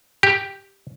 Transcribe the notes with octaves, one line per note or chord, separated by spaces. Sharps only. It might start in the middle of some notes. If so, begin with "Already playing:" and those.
G4